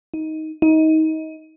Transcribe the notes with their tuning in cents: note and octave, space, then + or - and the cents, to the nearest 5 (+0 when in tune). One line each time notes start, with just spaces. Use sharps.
D#4 +15
D#4 +25